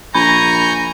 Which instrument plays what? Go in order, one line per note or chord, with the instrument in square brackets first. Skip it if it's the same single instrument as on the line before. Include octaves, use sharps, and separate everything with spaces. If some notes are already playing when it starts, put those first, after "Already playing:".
[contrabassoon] A#1 [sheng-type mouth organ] G#5 C#6 G6 [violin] A#5 [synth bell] B5